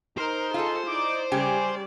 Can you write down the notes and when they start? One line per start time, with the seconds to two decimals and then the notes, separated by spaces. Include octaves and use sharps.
0.18 D#4 A#4 C5
0.54 F4 G#4 A4
0.87 D#4 E4 D5 D6
1.32 C#3 G3 G4 D5 G#5